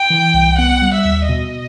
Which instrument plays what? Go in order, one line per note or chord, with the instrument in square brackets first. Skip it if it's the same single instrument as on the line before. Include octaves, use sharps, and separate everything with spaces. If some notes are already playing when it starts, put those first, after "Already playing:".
Already playing: [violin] G5
[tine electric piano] E3
C2
[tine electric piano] B3 [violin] F#5
[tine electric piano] G3
[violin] E5
[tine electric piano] D#2
[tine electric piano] B2 [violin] D#5